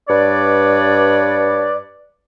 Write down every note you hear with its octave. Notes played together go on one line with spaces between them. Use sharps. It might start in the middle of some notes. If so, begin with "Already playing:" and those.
G2 B4 C#5 D5